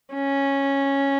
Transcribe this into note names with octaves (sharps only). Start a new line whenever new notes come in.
C#4